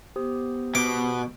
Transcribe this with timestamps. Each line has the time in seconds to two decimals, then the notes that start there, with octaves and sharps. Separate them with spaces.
0.16 B3 G4 C5 D#6
0.75 B2 D6